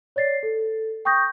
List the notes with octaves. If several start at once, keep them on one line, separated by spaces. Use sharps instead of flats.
C#5 D5 A6 C7
A4
G5 C#6 D#6 G6 A#6